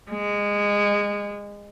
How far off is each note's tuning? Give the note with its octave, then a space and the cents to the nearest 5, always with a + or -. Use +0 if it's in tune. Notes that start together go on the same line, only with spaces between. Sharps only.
G#3 -20